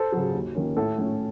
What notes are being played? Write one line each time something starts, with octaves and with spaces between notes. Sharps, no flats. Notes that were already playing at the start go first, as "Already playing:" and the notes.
Already playing: A4 C5
C#3 F#3
D#2
D#3 A#3 C#4
A2 A4
A3 C#4